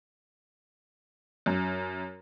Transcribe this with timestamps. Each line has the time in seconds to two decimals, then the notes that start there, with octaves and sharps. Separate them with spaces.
1.46 F#2